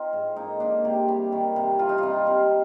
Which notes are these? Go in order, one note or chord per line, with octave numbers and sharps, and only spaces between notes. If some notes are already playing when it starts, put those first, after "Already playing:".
Already playing: C4 D#4 F4
G#2
A#3 D#4
A#3 D4
C3 G4
G3 G4
D#3
C3
G3 F4
D#4
C3 F4
C3